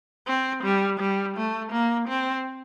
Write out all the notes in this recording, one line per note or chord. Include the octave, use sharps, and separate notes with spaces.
C4
G3
G3
A3
A#3
C4